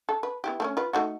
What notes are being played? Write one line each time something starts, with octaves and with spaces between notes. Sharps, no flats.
A4
B4
B3 E4 G4
A3 A#3 C#4
F4 B4
A3 D#4 F#4